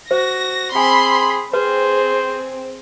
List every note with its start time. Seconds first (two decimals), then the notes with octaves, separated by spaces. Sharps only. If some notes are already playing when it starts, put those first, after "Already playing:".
0.11 F#4 C5 A#6
0.75 C4 G#4 G5 G#5 B5 C6
1.53 C4 G#4 B4 C5